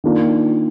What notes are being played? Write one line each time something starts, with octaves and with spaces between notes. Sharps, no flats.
D#3 A#3 D4 F4